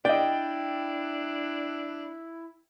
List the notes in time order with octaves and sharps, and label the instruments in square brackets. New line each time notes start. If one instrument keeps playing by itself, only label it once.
[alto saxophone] D4 [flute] E4 [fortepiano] D5 D#5 [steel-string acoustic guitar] G5